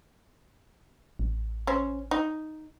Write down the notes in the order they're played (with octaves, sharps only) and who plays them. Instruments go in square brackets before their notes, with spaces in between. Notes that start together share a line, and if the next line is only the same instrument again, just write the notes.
[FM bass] A1
[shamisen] C#4 C5
D#4